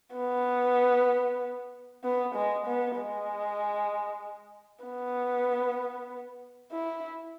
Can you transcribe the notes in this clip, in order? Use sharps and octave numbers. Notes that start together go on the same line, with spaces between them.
B3
B3
G#3
B3
G#3
B3
E4